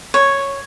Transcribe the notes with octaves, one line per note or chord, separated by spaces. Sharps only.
C#5